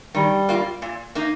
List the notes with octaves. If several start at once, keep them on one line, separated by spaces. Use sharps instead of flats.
D#3 G3
A#3 F4
A#2
A#3 D#4